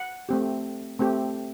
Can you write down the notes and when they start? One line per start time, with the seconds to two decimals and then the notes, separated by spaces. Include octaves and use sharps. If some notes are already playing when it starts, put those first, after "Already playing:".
Already playing: F#5
0.29 A3 C4 G4
0.99 A3 C4 G4